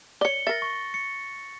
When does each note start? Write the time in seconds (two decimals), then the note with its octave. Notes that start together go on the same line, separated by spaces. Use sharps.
0.21 C#5 D5 C#7 G7
0.47 A#4 E5 A6 A#6
0.62 C#6
0.94 C#7